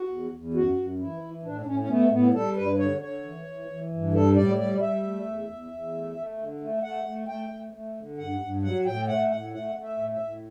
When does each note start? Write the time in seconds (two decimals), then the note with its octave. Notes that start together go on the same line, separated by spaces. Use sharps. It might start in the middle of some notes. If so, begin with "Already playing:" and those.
Already playing: F#4
0.08 E2
0.31 E2
0.54 F#2 F#4
0.76 F#2
0.98 E3 E4
1.21 E3
1.43 A2 D4
1.61 D4
1.66 A2 C#4
1.80 C#4
1.88 A3 B3
2.11 A2 B3
2.34 G3 A4
2.56 G2 B4
2.78 D3 C#5
3.00 D3 C#5
3.23 E3
3.46 E3
3.68 E3
3.91 G2
4.13 G3 A4
4.36 A2 D5
4.59 G3 D5
4.81 G3 E5
5.03 A3
5.26 E2
5.48 E2
5.71 E2
5.94 A3
6.16 A3
6.38 D3
6.61 A3
6.83 A3 F#5
7.05 A3
7.28 A3 G5
7.50 A3
7.73 A3
7.96 D3
8.18 G2 F#5
8.41 G2
8.62 F#3 F#5
8.86 A2 G5
9.08 A3 F#5
9.30 A2 F#5
9.53 A3 F#5
9.76 A3
9.83 E5
9.97 A2
10.13 E5
10.20 A2